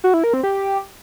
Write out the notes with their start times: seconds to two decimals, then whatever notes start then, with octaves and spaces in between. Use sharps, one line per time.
0.04 F#4
0.14 E4
0.24 A#4
0.34 C4
0.43 G4